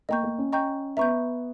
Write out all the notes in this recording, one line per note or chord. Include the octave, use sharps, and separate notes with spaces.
A#3 D#5 G5 A#5 C#6 G6
A#3
C#4
D#5 G5 A#5 C#6 G6
B3 E5 A#5 C#6 G6